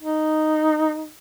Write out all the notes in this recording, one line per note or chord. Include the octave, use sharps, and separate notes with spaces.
D#4